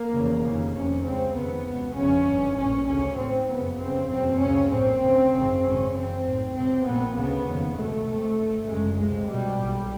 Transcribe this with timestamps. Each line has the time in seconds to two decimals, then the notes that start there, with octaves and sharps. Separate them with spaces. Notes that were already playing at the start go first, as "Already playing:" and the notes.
Already playing: A#3
0.13 F1 E2 C#3
0.43 F1 D#2 C#3
0.73 F1 F2 C3 C#4
1.04 C#2 C#3 C4
1.34 F1 D#2 C#3 B3
1.65 C#2 B2
1.95 G1 F2 C#3 C#4
2.26 G1 G2
2.56 A#1 A2 C#4
2.87 D2 C#3 C#4
3.17 A1 G#2 C4
3.48 F#1 F2 C#3 B3
3.78 G1 F2 C#3 C4
4.09 F#1 E2 B2 C4
4.39 D2 C#3 C#4
4.69 A#1 A2 C4
5.01 D2 C#3
5.31 G#1 F#2 C#3
5.61 G#1 F#2 C#3 C#4
5.91 F#1 E2 C#3 C4
6.22 B1 A2
6.53 C#2 C3 C4
6.83 A#1 A#2 B3
7.14 D2 C#3 B3
7.44 F1 D#2 C#3
7.75 C#2 B2 A3
8.05 C#2 C3
8.35 G1 G2
8.66 G1 F#2 C#3 G#3
8.97 C#2 C3 G#3
9.27 C#2 B2 G3
9.58 B1 A#2